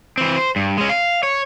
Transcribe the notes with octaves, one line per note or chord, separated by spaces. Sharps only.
E3 C4
C5
G2
G#3 C#4
F5
C#5